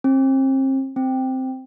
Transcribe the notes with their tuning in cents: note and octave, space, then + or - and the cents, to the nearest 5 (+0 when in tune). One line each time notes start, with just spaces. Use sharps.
C4 +35
C4 -5